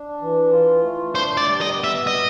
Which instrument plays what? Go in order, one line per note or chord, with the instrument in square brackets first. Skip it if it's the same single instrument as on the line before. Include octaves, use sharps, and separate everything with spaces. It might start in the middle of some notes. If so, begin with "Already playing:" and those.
Already playing: [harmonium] D4
E3
F4
A3
[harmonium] D4 [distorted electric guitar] C5
[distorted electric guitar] D5
[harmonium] G3
[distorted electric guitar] D#5
[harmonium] B3
[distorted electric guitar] E5
[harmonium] B2 [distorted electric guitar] D#5